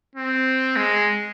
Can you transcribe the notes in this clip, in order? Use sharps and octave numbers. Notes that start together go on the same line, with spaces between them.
C4
G#3